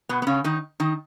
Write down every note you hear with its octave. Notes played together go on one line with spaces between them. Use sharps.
B2 B3
B3
C#3 C#4
D#3 D#4
D#3 D#4